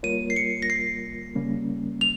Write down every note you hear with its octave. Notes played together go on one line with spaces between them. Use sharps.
G3 A#3 F4 A#4 C#5 D#7
C7
C#7
A#6
C7
C#3 G3 A#3 C#4
F7